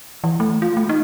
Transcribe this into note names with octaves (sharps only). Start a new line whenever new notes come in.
E3
A3
F4
A3
D#4